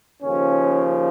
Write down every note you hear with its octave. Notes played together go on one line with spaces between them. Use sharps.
D#2 C#3 F3 C#4